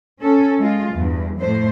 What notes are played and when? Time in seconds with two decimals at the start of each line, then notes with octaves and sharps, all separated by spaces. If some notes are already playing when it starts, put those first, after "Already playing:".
0.21 C#4 A4
0.60 G#3 F4
0.95 E2 G2
1.40 F2 A2 A3 C5